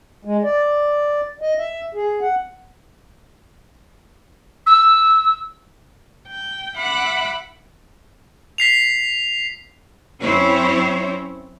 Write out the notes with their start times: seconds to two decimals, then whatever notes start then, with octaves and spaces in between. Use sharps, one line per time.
0.25 G#3
0.44 D5
1.41 D#5
1.58 E5
1.94 G#4
2.21 F#5
4.66 E6
6.26 G5
6.75 E5 F#5 B5 D6 F#6
8.58 B6 C7 F7
10.22 F#2 C4 C#4 E4 C5 C#5